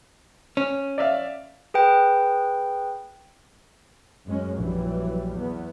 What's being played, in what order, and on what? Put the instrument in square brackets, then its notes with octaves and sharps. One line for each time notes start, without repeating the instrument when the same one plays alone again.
[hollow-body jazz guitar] C#4
[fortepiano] D5 E5 F5
[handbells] G#4 B4 G5
[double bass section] F#2 G#3 C#4
[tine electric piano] A#1 [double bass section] E3 F#3 G3
[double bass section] E2 B3